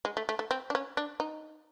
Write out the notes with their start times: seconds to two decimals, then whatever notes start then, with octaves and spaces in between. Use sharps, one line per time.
0.05 G#3
0.17 A3
0.29 A3
0.39 A3
0.51 C4
0.70 D4
0.75 C#4
0.97 D4
1.20 D#4